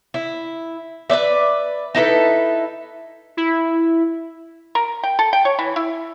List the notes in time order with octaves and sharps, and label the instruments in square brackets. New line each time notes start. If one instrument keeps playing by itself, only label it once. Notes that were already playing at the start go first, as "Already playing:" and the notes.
[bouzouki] E4
B4 C5 D5 E5
D#4 E4 A4 B4
[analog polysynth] E4
[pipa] A#4
G5
A4
G5
C#5
E3
E4